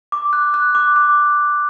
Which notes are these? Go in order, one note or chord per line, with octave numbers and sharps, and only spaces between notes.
D6
F#6
F#6
D6
D6